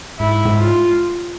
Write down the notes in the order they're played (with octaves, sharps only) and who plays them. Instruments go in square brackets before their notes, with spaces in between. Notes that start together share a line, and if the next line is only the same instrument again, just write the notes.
[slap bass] G#2 [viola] E4
[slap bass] G#2
[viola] F4